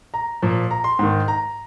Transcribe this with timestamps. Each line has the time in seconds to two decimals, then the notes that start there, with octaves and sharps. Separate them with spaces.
0.14 A#5
0.42 A#2 F3
0.71 A#5
0.84 C6
0.99 G#2 D#3
1.28 A#5